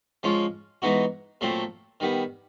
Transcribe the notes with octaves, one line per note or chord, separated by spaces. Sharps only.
F3 G#3 C#4 F4
E3 G#3 B3 D#4 F#4
A#2 F#3 A3 C4 F4
D#3 G3 B3